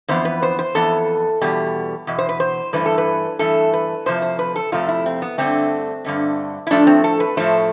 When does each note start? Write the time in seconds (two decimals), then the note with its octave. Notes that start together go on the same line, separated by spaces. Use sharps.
0.08 F2 E3 B3 C5
0.25 B4
0.43 C5
0.59 C5
0.75 F2 E3 B3 A4
1.41 E2 B2 G3
2.07 E2 B2
2.18 C5
2.29 B4
2.40 C5
2.73 G2 E3 A3 B4
2.86 A4
2.98 B4
3.39 G2 E3 A3 A4
3.73 B4
4.06 F2 C3 F3 A3 C5
4.22 C5
4.39 B4
4.56 A4
4.72 F2 C3 F3 A3 F4
4.88 E4
5.06 C4
5.22 B3
5.38 G2 D3 A3 C4
6.04 G2 D3 A3
6.67 E4
6.71 A2 F3 A3 D4
6.87 C4
7.04 A4
7.20 B4
7.37 A2 F3 A3 C5